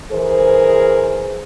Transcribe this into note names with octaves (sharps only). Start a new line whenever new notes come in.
E3 G#4 A#4 C5